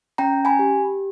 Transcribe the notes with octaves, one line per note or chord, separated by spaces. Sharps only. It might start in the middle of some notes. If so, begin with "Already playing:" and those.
C#4 G5 A#5
G#5 B5
G4